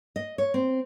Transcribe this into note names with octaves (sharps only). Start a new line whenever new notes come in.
D#5
C#5
C4